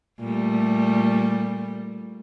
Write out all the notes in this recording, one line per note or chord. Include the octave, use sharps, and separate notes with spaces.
A#2 G3 A3